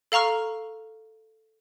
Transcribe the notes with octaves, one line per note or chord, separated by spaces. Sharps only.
A4 F5 A#5 C#6 F6